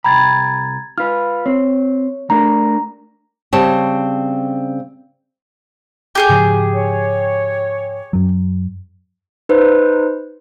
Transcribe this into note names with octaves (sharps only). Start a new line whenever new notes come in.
C2 G5 A#5 B5 G#6 A6
F4 B4 F6
C4 C#5
A3 D4 A#4 A#5
C#3 G3 C4 C#5 A5
G4 G#4 G6
G#2 C#3 F3
C#5
F#2 F#3
D#4 B4 C5